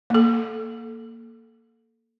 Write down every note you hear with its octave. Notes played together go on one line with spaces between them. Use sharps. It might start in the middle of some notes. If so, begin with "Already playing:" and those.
A#3 A4